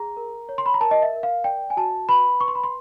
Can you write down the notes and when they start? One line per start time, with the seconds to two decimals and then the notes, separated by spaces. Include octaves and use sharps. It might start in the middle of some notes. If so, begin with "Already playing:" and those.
Already playing: G#4 A#5
0.17 A#4
0.49 C#5
0.58 C6
0.66 B5
0.74 A#5
0.81 A#4 A5
0.91 D#5
1.02 E5
1.13 A#4
1.23 F5
1.44 D5 G5
1.70 G#5
1.77 F#4 A5
2.09 B4 B5
2.40 B4 C#6
2.48 C6
2.55 B5
2.64 C6